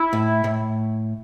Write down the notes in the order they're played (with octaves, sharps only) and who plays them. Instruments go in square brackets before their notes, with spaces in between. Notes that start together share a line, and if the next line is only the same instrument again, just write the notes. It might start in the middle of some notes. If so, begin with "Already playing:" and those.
Already playing: [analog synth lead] E4
[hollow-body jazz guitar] A2
A2